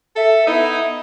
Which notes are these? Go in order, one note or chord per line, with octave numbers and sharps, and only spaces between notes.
A4 E5
B3 D#4 E4